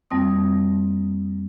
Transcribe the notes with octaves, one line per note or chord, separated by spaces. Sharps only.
F2 G3 A#3 C4 D#6